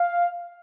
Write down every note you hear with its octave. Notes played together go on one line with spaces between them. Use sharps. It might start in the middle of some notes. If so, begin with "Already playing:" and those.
Already playing: F5